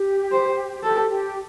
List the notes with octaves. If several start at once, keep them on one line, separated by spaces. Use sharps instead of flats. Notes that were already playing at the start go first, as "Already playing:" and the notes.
Already playing: G4
C5
G4 A4
G4